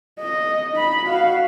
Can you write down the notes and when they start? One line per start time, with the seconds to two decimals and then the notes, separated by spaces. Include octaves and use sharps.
0.20 D#5
0.73 D#4 B5
1.06 F#4 F5